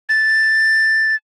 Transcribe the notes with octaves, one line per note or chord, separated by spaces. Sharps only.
A6